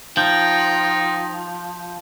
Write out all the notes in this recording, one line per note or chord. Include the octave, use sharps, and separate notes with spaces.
F3 D#4 G5 G6